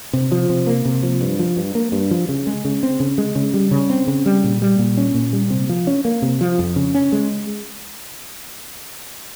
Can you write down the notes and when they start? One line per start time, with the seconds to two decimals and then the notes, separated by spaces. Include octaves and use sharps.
0.13 C3
0.32 F3
0.50 C3
0.67 A#3
0.85 C3
1.03 F3
1.21 G2
1.39 F3
1.57 G2
1.75 A#3
1.92 G2
2.11 F3
2.29 C#3
2.47 G#3
2.65 C#3
2.83 C4
3.00 C#3
3.18 G#3
3.35 C#3
3.54 G3
3.71 C#3
3.90 C4
4.07 C#3
4.26 G3
4.44 A#2
4.62 G3
4.79 A#2
4.98 C#4
5.15 A#2
5.33 G3
5.50 C3
5.69 F3
5.87 C#4
6.05 A#3
6.22 C3
6.41 F3
6.59 F2
6.76 C#3
6.95 C#4
7.12 G#3